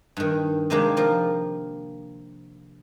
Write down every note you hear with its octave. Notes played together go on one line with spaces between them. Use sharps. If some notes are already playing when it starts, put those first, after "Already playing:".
G2 D#3
C3 D#3 G#3 A#3 D4 G4
F3 A#4